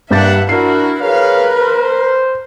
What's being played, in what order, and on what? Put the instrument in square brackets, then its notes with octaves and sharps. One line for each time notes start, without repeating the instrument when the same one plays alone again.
[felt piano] G2 G6 A6 [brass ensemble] G3 A#3 D4 [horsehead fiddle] E5 F#5
[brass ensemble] D4 E4 [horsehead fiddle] F#4 A#4 [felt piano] C7
[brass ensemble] G#4 C#5 F5 [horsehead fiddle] A#4 B4
[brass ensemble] C5